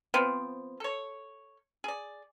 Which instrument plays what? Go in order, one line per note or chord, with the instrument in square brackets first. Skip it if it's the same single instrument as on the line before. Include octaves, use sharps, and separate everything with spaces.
[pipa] F3 B3 C4
A4 C#5
G#4 D5